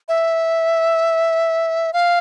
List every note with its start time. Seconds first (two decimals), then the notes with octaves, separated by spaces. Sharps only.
0.09 E5
1.93 F5